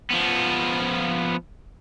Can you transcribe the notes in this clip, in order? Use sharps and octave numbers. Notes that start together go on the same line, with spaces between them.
F3 B3